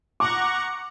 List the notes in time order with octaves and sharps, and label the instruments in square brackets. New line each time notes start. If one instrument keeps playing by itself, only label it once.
[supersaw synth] F#5 A#5 C#6 [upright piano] D6